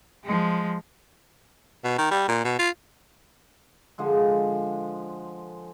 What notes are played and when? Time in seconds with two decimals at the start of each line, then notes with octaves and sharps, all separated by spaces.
0.24 F3 G#3
1.84 B2
1.98 D#3
2.11 G3
2.28 A#2
2.45 B2
2.59 F4
3.98 D3 F3 G#3